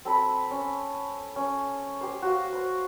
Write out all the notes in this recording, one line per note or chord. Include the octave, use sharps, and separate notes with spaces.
C4 A4 B5
C#4
C#4
G4 C5
F#4 F5
C5